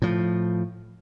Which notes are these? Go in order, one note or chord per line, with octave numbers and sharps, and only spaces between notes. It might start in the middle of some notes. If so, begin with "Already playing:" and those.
A2 F3